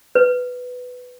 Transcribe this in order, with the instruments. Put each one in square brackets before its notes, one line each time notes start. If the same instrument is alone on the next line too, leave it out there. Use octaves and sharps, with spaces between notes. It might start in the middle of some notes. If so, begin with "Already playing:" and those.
[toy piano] B4